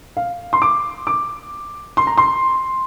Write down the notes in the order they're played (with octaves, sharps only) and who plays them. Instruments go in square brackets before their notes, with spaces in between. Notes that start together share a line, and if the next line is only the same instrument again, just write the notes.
[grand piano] F5
C6
D6
D6
C6
A#5
C6